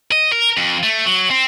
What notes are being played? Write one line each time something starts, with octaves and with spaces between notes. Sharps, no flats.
D#5
A#4
F2
A3
F#3
C4